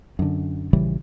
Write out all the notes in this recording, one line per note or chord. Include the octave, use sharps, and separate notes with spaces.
F#2 D3
A#1 C#3 E3 G3